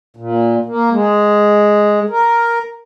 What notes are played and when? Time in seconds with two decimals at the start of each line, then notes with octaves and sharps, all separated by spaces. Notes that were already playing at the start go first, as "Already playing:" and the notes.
0.17 A#2
0.65 A#3
0.91 G#3
2.10 A#4